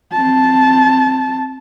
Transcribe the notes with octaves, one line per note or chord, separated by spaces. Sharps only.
C4 A5